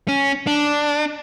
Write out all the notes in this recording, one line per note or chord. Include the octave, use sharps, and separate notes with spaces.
C#4
D4